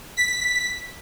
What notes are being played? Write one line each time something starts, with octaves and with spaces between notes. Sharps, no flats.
B6